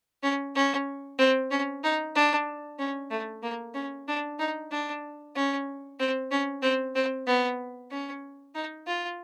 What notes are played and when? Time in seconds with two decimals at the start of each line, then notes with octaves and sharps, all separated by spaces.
0.23 C#4
0.55 C#4
1.19 C4
1.51 C#4
1.84 D#4
2.15 D4
2.79 C#4
3.11 A3
3.43 A#3
3.74 C#4
4.08 D4
4.39 D#4
4.71 D4
5.36 C#4
5.99 C4
6.31 C#4
6.62 C4
6.95 C4
7.27 B3
7.91 C#4
8.55 D#4
8.87 F4